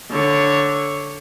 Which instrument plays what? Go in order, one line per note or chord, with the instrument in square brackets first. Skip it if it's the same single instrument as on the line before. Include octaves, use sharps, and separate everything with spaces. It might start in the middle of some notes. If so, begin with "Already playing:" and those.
[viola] D3 C#5